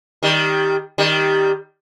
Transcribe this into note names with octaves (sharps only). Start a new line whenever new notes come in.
D#3 G3
D#3 G3